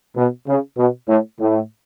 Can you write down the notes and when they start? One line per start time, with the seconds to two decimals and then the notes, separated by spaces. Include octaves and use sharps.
0.16 B2
0.47 C#3
0.77 B2
1.08 A2
1.39 A2